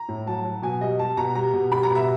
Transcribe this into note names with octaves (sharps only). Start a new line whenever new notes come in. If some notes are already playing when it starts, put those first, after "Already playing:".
Already playing: A#5
A2
F#3 A5
F#3
B2 G#5
G3 D#5
G3 A5
B2 A#5
G3 A#5
B2
G3 B5
A#5
B2
E5